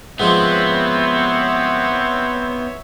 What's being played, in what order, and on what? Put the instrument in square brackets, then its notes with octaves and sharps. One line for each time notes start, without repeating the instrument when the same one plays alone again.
[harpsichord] G#2 F3 [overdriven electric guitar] B3 [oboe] C4 [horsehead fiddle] C#5 E5